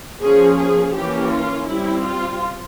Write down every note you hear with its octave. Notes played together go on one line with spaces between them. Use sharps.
F3 A#3 C#4 G#4
G#4
E3 A#3 C#4 G4
F4
G3 C4 E4
F4